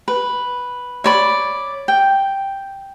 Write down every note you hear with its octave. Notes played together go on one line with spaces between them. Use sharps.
B4
C#5 D5 B5
G5